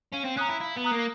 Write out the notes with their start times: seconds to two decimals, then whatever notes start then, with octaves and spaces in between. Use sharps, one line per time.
0.14 C#4 F5
0.25 C4
0.37 C#4 A#5 D#6 F#6
0.49 E4
0.61 E4 F5
0.77 B3
0.84 A#5 D#6 F#6
0.92 A#3